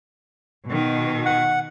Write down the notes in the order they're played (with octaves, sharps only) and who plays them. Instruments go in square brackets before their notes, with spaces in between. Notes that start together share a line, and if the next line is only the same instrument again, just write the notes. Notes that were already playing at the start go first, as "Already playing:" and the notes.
[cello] B2 D#3
[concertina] F#5